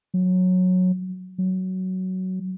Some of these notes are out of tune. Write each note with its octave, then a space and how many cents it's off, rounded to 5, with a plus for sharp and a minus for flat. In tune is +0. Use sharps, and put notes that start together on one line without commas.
F#3 -15
F#3 +10